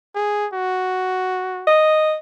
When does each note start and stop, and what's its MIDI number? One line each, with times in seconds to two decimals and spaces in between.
0.15 0.47 68
0.53 1.70 66
1.67 2.15 75